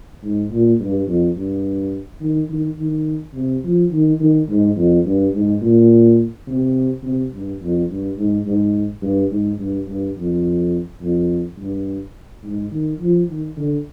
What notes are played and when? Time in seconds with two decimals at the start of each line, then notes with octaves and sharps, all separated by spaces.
0.23 G#2
0.51 A#2
0.80 G2
1.07 F2
1.37 G2
2.21 D#3
2.50 D#3
2.78 D#3
3.34 C3
3.64 F3
3.91 D#3
4.20 D#3
4.49 G#2
4.76 F2
5.05 G2
5.34 G#2
5.62 A#2
6.47 C3
7.03 C3
7.33 G2
7.61 F2
7.89 G2
8.17 G#2
8.46 G#2
9.02 G2
9.31 G#2
9.59 G2
9.87 G2
10.17 F2
11.02 F2
11.58 G2
12.43 G#2
12.71 D#3
13.00 F3
13.29 D#3
13.56 D3